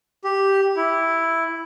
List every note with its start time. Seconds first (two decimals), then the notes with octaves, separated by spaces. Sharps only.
0.24 G4
0.76 E4